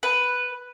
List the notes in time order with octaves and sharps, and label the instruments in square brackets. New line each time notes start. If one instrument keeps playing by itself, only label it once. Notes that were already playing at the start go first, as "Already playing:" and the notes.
[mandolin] B4